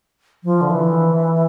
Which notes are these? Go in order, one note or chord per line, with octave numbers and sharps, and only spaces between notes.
F3
D3
E3